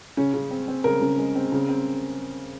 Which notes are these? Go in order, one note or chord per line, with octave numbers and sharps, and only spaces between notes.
C#3 C#4
C#3
C4
C4
C#3 A#4
C#3
G#3
C4
C#3
C4